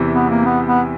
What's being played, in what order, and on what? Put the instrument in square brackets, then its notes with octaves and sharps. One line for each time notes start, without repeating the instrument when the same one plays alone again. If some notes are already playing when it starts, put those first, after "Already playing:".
Already playing: [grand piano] E2 C3 E3
[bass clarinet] B3
A#3
B3
B3